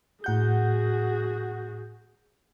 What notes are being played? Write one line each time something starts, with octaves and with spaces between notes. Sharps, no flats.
A2 F#4 G#4 F#5 G6